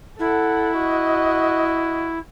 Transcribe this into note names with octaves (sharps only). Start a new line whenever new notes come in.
E4 A4 F#5
F#4 D#5